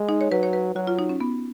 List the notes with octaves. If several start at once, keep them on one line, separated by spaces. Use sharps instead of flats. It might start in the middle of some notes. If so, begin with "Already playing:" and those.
Already playing: G#3
D#4
C#5
F#3 B4
C#5
B4
F#3 F#4
F4
D#4
C#4
B3